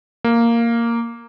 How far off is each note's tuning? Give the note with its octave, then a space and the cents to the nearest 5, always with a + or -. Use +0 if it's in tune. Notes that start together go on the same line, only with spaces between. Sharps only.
A#3 -5